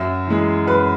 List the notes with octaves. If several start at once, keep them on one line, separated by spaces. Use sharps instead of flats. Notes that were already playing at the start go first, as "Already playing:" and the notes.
Already playing: F#2 E5
E3 G#3
F#2 B4